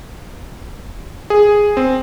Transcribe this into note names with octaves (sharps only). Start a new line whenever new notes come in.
G#4
C4